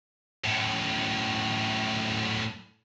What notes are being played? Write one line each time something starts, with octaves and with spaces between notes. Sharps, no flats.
F#2 A2